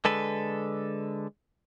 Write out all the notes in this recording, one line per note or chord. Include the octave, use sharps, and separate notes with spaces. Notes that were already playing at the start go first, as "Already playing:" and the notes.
D3 G#3 A4 B4